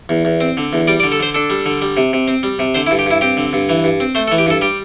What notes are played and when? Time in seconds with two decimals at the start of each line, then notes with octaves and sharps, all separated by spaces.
0.09 E2
0.25 E2
0.41 C4
0.57 D3
0.73 E2
0.87 G3 D5
1.00 D5
1.03 D3
1.12 A4
1.20 D3 C5
1.34 D4 A4
1.50 G3
1.66 D3
1.82 G3
1.97 C3
2.13 C3
2.28 C4
2.43 G3
2.59 C3
2.74 D3 C5
2.87 E4
2.91 G2
2.99 G4
3.06 G2 E4
3.21 C4 G4
3.37 D3
3.53 G2
3.69 E3
3.84 G2
4.00 C4
4.15 A3 C5
4.28 A4
4.32 E3
4.38 G4
4.46 G2 A4
4.62 G3 G4